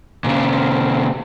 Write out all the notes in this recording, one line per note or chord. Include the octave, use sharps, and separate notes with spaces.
A#2 C#3